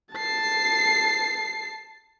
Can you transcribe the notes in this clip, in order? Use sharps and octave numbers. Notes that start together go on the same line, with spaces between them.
A5 C7